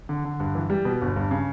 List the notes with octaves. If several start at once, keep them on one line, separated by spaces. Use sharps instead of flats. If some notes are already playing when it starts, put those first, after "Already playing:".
D3
D3
G2
E3
G3
B2
G1
G2
C#3